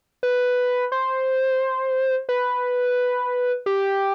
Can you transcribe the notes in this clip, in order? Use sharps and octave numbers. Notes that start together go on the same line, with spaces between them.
B4
C5
B4
G4